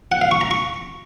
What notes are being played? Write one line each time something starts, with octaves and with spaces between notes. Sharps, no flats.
F#5
F5
C#6
A#5
C#6